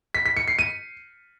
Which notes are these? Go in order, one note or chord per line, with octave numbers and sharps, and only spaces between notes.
B6
B6
C#7
C7
D#7